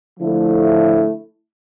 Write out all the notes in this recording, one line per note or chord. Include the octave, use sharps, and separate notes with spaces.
D3 F3 A3 E4